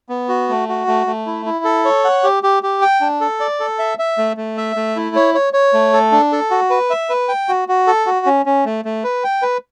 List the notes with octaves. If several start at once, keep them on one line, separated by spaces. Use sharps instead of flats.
B3
F#4
A3
F#4
A3
A3
E4
E4
A4
C#5
F#5
G4
G4
G4
G5
D4
A4
D5
A4
E5
E5
A3
A3
E5
A3
E4
C#5
C#5
C#5
A3
A4
D4
A4
F#4
B4
E5
B4
G5
F#4
F#4
A4
F#4
C#4
C#4
A3
A3
B4
G5
B4